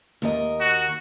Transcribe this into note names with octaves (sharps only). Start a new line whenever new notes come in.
D#2 A#4 D#5
F#4